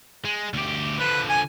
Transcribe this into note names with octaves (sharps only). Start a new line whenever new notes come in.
G#3
D2 G4
D3 F3 B4
G#5